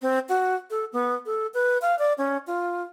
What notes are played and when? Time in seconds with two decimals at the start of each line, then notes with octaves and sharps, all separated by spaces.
0.02 C4
0.29 F#4
0.70 A4
0.93 B3
1.26 A4
1.54 B4
1.82 F5
1.99 D5
2.18 C#4
2.47 F4